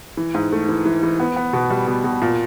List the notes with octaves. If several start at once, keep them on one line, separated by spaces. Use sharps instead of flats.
E3
G#2
A3
E3
E3
E3
B3
B3
B2
G3
B2
B2
A#2